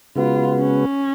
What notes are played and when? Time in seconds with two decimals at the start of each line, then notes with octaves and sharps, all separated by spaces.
0.16 C#3 G#3 B3 F4 F#4 B4
0.59 C#4